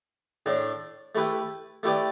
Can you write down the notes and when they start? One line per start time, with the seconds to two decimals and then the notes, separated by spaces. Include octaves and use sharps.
0.46 A2 A3 D4
1.15 A3 E4 G4 B4
1.83 A3 E4 G4 B4 D5